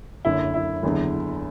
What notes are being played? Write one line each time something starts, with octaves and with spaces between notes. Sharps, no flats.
F#1 F#2 D3 E4
E4
F#1 E2 D3